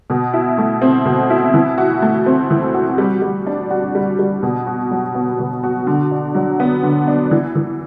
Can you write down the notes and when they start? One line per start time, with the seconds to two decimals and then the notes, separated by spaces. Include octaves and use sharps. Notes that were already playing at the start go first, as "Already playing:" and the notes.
0.10 B2
0.34 E4
0.58 A3
0.82 C4
1.05 B2
1.30 E4
1.54 E3
1.78 F#4
2.02 A3
2.26 C4
2.50 E3
2.74 F#4
2.98 G3
3.22 G3
3.47 D4
3.70 F#4
3.95 G3
4.19 G3
4.43 B2
4.67 F#4
4.91 F#3
5.15 B3
5.39 B2
5.63 F#4
5.87 D3
6.11 D4
6.35 F#3
6.60 B3
6.83 D3
7.07 D4
7.31 E3
7.55 E3